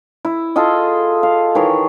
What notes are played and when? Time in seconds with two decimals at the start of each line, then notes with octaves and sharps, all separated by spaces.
0.25 E4
0.56 F4 G#4 A4 D#5
1.23 F5
1.55 D#3 E3 G#4 C#5